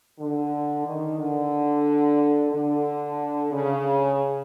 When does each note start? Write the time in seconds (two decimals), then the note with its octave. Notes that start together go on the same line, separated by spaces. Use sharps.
0.19 D3
0.85 D#3
1.19 D3
2.52 D3
3.52 C#3